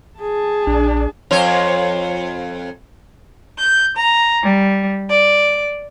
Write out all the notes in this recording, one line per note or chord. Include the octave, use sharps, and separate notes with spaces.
G#4 A5
A#1 D4
F2 C5 C#5
G6
A#5
G3
D5